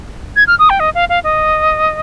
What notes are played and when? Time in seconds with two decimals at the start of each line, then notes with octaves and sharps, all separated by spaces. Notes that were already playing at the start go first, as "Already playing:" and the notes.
0.36 G#6
0.47 F6
0.59 D#6
0.70 G5
0.80 D#5
0.95 F5
1.09 F5
1.24 D#5